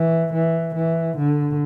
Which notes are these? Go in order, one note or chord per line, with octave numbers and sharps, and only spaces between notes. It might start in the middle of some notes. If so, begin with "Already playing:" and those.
Already playing: E3
E3
E3
D3